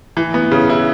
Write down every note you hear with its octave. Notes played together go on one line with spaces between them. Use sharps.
E3
B3
C#3
E4